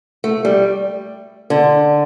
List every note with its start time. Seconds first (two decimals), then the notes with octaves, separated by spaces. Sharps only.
0.24 A3
0.45 G3
1.50 D3